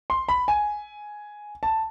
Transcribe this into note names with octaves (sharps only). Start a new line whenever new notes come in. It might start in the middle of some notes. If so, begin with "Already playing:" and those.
C6
B5
G#5
A5